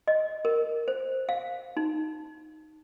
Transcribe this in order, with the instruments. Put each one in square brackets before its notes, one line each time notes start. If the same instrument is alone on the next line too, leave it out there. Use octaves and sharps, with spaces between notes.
[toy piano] D#5
A#4
C5
F5
D#4